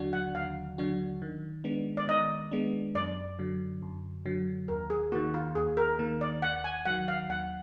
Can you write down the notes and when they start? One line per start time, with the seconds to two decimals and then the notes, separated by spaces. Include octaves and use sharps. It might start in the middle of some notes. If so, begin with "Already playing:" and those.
Already playing: D#2 D3 F#3 D4 F#4
0.13 F#5
0.34 D#2 F5
0.78 D3 F#3 D4 F#4
1.22 D#3
1.64 G#3 B3 D4
1.97 D5
2.08 D#3 D#5
2.51 G#3 B3 D4
2.95 F#2 D5
3.39 D3 F#3
3.82 F#2
4.26 D3 F#3
4.68 D#2 A#4
4.90 G#4
5.12 D#3 A#3 F#4
5.34 F4
5.55 D#2 G#4
5.77 A#4
5.99 D#3 A#3
6.21 D5
6.42 D#2 F#5
6.64 G#5
6.86 D#3 F#3 F#5
7.08 F5
7.29 D#2 F#5